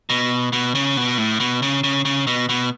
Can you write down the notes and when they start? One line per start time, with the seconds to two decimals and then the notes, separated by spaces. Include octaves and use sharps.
0.10 B2
0.53 B2
0.75 C#3
0.97 B2
1.18 A2
1.40 B2
1.62 C#3
1.84 C#3
2.05 C#3
2.27 B2
2.49 B2